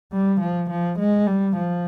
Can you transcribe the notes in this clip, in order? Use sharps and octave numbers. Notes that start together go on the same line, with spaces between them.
G3
F3
F3
G#3
G3
F3